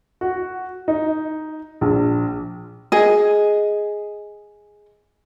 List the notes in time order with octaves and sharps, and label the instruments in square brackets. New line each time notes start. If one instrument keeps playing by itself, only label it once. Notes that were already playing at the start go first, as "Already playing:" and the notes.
[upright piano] F#4
D#4
A#1
[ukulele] G#4 D#5